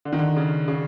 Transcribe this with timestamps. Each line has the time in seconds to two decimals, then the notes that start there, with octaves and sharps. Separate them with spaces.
0.05 D3
0.13 D#3
0.19 D3
0.36 C#3
0.68 C#3